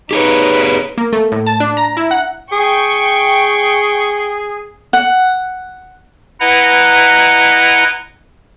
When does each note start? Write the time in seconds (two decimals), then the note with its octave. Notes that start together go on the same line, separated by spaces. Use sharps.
0.11 D#4 G4 G#4 B4 C#5
0.98 A#3
1.13 A3
1.32 A2
1.47 A5
1.60 D4
1.77 A#5
1.97 E4
2.11 F#5
2.52 G#4 G5 C#6
4.93 F#5
6.40 E4 B4 D#5 F#5 A#5